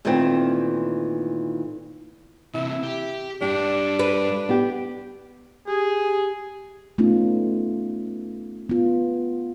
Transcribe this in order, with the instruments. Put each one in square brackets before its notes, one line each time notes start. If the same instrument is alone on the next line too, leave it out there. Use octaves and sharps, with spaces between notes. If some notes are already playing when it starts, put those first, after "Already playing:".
[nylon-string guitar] A#2 D#3 E3 A3 B3 C4
[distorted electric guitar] C3 E3 [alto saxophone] E4
[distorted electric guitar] G4
[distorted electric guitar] G2 G3 [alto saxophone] D4 [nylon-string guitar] G4
[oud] B4
[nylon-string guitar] B3 G4
[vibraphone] G4 [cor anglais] G#4
[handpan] A3 B3 C#4 D#4 F4
B3 F4